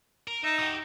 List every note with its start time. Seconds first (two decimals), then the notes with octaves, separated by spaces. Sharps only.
0.28 A#4
0.44 D#4 E5
0.59 F#4 G4